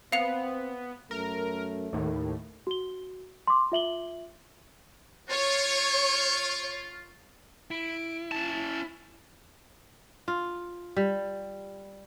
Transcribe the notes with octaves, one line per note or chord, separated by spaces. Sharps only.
B3 C4 F5 C#7 F7
F#2 A3 A#4
D#2 A2 D#3
F#4 G7
C6 D6
F4 E5 F#7 G7
F4 C#5
E4 D7
C#4 A5 A6
F4
G3